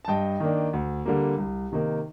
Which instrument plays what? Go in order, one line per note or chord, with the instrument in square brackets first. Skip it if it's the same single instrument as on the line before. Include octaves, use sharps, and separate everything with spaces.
[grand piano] A5
G2 D#5 G5
D#3 A#3 D4
D2
D3 G3 A#3
C2
C3 D#3 A#3 D#4